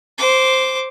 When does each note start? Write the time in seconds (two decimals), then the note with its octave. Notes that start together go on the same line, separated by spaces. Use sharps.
0.18 C5 D6